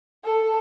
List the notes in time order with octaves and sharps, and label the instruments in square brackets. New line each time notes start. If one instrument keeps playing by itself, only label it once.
[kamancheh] A4